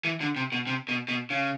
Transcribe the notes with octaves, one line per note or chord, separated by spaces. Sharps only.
E3
D3
C3
B2
C3
B2
B2
C#3